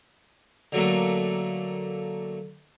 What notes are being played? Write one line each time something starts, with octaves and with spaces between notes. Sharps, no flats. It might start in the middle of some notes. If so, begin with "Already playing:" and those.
D3 F#3 A3 A#3